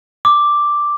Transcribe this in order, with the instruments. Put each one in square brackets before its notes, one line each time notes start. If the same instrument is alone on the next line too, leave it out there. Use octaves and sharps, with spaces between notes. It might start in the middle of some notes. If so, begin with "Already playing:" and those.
[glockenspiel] D6